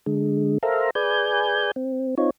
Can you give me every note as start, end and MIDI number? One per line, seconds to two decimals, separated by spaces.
0.06 0.58 50
0.06 0.58 56
0.63 0.90 69
0.63 0.90 70
0.63 0.90 72
0.63 0.90 76
0.63 0.90 77
0.63 0.90 82
0.95 1.71 68
0.95 1.71 71
0.95 1.71 74
0.95 1.71 80
0.95 1.71 91
1.76 2.15 60
2.18 2.30 60
2.18 2.30 63
2.18 2.30 65
2.18 2.30 73